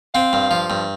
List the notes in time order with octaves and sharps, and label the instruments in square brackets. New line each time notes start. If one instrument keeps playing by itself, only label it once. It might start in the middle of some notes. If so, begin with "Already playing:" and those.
[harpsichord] C4 [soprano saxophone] F5
[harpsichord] G2
F3
G2